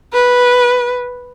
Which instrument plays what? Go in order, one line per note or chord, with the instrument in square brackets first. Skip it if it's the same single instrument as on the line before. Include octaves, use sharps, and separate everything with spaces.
[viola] B4